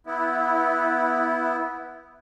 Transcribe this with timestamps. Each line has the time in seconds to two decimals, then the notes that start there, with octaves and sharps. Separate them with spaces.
0.07 B3 E4